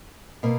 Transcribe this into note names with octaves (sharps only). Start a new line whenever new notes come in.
B2 A#3